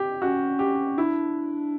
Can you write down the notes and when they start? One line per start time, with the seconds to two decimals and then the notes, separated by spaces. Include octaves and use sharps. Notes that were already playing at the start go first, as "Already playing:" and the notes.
Already playing: G4
0.22 C#4 F#4
0.59 G4
0.98 D4 E4